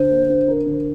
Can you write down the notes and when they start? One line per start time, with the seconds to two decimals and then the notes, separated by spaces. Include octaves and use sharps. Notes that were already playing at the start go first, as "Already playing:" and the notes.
Already playing: D3 D4 C5
0.11 A#3
0.29 D4
0.48 A#4
0.66 D3